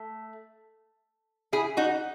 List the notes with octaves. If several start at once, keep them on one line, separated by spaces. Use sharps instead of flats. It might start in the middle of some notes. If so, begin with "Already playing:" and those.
Already playing: A3
E4 G#4
D#4 F#4